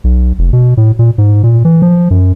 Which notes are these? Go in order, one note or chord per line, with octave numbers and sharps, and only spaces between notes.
B1
F1
B2
A2
A#2
G#2
A#2
E3
F3
F#2